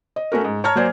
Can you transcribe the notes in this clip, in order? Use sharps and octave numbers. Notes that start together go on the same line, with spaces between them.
D#5
A3 C#4 F#4 A#4
G#2
C#5 A5 A#5 F6 G#6
F#3 A#3 C5 D5 G#5